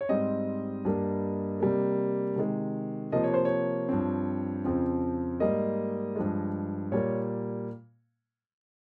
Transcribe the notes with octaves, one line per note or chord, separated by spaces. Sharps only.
C#5
G#2 G3 C4 D#5
G2 G3 A#3
C3 G3 A#3
C3 D#3 G#3
C3 F3 A#3 D#5
C#5
C5
C#5
G2 F3 C4
F2 C#3 F3 C4
G#2 G3 A#3 D#5
G2 F3 G#3
A#2 G3 A#3 C#5